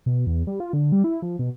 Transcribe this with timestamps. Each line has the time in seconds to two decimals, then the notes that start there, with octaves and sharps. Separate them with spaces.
0.06 B2
0.27 E2
0.47 G3
0.60 F4
0.73 D3
0.92 G3
1.04 E4
1.22 F3
1.39 B2